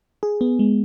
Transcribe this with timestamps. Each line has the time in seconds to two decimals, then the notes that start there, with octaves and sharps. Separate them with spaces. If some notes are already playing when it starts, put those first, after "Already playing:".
0.23 G#4
0.41 B3
0.59 G#3